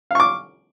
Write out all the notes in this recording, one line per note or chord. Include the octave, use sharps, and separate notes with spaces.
F5 C#6 D6